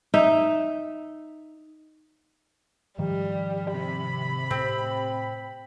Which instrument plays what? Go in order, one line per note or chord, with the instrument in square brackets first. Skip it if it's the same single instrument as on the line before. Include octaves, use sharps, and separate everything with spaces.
[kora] D#4 E5
[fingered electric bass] G#2 D#3 F3 [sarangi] G3
[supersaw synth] C3 [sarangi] B5
[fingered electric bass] A2 [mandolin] C4